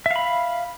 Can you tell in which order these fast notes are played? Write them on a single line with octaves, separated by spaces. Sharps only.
E5 F5 B5